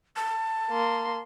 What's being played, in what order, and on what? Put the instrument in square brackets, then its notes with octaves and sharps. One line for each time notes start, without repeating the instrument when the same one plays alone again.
[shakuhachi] A5
[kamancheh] A#3 C6